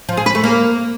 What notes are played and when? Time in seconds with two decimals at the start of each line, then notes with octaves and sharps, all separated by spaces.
0.09 F3
0.17 G#4
0.26 B4
0.35 A3
0.44 A#3